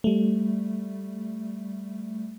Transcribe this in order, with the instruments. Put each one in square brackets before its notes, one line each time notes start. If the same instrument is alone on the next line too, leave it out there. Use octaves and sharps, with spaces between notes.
[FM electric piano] G3 A3